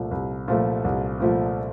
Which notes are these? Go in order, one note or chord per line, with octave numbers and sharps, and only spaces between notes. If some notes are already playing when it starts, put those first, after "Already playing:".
Already playing: C2 A#2 F3 A3
C2
A#2 F3 A3
C2
A#2 F3 A3